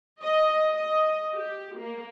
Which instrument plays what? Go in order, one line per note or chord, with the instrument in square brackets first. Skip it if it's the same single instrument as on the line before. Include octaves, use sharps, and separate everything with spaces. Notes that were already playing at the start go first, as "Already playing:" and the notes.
[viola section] D#5
D#5
G4
A#3